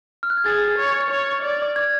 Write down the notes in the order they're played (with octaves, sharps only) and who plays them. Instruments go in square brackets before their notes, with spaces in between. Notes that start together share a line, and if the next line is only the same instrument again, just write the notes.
[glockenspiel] F6
F#6
G#6
[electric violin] G#4 [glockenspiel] A6
[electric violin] C#5
C#5
D5
[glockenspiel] G#6